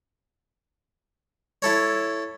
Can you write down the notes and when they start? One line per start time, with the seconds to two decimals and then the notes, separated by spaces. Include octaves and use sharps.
1.62 E4 A4 C#5